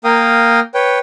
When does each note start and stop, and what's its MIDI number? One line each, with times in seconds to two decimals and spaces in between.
0.04 0.60 58
0.04 0.60 70
0.04 0.60 77
0.04 0.60 79
0.04 0.60 87
0.74 0.99 71
0.74 0.99 73
0.74 0.99 79